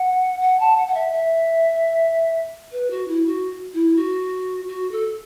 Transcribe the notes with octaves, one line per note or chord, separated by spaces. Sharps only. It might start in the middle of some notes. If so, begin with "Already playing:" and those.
Already playing: F#5
F#5
A5
F#5
F#5
E5
E5
B4
F#4
E4
F#4
E4
F#4
F#4
A4